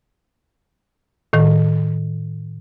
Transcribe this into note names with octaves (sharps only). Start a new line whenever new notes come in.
A2 D#3